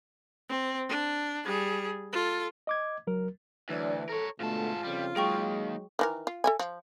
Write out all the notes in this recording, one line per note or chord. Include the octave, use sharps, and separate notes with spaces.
C4
D4
G3 G#4
F4 A4
D#5 D6 G#6
C#2 F#3 A#4
D2 E3 F#3 D4 D5
A4 A#4 C#5
G#2 B2 D3 A3 F4 A5
F2 C#3 G3
F#3 G#3 A#3 D#4 G#4 G5 C#6
D#3 E3 A#4
F4
A4 E5 G#5
F3